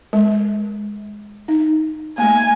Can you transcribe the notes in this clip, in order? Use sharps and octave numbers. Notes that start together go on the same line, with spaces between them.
G#3
D#4
A3 A#3 G#5